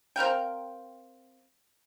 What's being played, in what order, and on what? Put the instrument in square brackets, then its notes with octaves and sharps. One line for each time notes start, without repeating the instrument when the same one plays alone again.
[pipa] C4 A#4 F5 G5